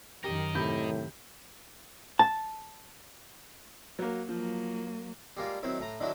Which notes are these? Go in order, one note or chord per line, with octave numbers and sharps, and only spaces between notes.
F#2 D#3 G4 A#4 D#5
A2 C3 B5 G6
A5
F#3 A#3
F3 F#3 A#3
G3 G#3 A#3 F4
D#3 F#3 C4 E4
A2 A#5
D3 D#3 F#3 E4 F#4